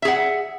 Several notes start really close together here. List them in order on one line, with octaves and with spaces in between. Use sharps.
E5 G#4 F#5